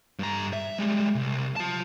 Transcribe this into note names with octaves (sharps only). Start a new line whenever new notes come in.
G2 A#5
E5
G3 G#3
C2
F4 A5